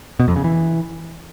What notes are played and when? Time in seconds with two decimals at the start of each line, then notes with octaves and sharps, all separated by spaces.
0.20 B2
0.28 F2
0.36 C#3
0.44 E3